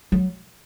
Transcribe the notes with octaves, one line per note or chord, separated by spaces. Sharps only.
F#3